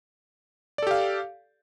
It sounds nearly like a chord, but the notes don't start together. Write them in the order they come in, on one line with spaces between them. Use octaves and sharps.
D5 A4 G4 F5